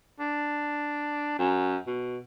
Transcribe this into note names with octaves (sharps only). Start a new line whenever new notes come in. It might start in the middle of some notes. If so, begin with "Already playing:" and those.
D4
F#2
B2